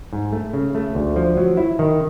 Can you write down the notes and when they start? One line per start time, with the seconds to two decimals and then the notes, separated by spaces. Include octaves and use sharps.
0.13 G#2
0.33 A3
0.53 C#3
0.75 A3
0.95 D2
1.16 F3
1.37 F#3
1.57 E4
1.79 D#3